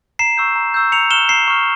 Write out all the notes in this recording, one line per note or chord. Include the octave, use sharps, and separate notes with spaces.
A#5 C7 E7
C#6 E6 G6
A#5
C#6 E6 G6
A#5 C#7 F7
C#6 F6 E7 G7
A#5 C7 E7
C#6 F6